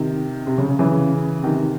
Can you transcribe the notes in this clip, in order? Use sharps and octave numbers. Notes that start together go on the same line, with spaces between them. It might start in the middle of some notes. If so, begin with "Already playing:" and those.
Already playing: C3 D#3
C3
C#3
C#3
C#3 E3
C3 D#3